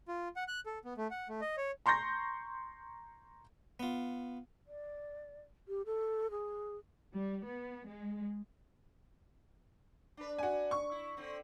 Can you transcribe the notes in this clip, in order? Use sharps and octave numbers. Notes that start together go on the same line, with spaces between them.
F4
F#5
F#6
A4
B3
A3
F#5
A3
D#5
C#5
A#5 C6 C#6 G6 A#6
B3 F4
D5
G4
A4
G#4
G3
B3
G#3
D4 B4
F#4 G#5
C#6
E4
D3 C4